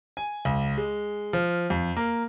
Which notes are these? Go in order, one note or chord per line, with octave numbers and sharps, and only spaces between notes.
G#5
C#2
G#3
F3
F2
A#3